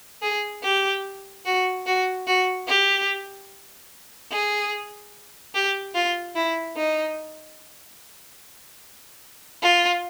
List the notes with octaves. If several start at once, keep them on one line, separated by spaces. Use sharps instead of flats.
G#4
G4
F#4
F#4
F#4
G4
G#4
G4
F4
E4
D#4
F4